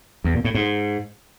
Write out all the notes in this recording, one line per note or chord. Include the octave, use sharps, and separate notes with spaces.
E2
A#2
A2
G#2